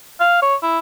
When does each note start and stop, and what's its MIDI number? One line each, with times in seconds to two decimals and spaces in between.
0.20 0.38 77
0.42 0.55 73
0.62 0.79 64